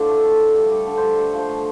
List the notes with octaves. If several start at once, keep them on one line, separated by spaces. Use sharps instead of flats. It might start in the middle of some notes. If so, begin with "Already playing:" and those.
Already playing: A2 D3 D4 F4 A4 C5
A3
A3
A3
G3
G3 A4
D3
G3 C5
A3 A4
F3 C5
A3